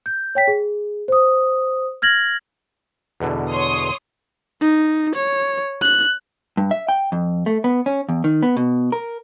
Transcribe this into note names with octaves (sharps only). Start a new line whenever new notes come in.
G6
C#5 G5 B6
G#4
C5 D#6
F6 G#6 A#6 F#7
E2 B2 D3
C#5 C6 D#6
D#4
C#5
F#6
G2
E5
G5
F2
A3
B3
C#4
E2
D#3
B3
B2
A#4